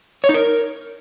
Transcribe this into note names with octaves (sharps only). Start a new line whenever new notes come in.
C#5
D#4
A#4